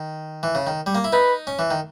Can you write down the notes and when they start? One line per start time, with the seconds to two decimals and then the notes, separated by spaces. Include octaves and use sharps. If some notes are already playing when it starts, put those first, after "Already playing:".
Already playing: D#3
0.43 E3
0.55 C#3
0.67 D#3
0.86 G3
0.95 A#3
1.04 E4
1.12 D#4 B4
1.47 C#4
1.59 E3
1.71 D#3